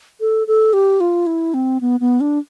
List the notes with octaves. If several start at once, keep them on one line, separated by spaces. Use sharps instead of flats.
A4
A4
G4
F4
E4
C4
B3
B3
D4